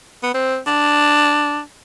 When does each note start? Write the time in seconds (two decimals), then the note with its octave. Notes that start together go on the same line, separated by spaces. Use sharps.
0.23 B3
0.34 C4
0.67 D4